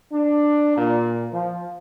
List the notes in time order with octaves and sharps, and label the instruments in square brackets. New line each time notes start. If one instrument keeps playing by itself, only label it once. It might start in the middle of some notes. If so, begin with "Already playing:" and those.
[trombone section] D4
A#2
F3